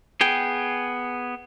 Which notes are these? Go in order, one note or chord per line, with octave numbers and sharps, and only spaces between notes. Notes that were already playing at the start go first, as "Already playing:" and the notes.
B3 G#4 G5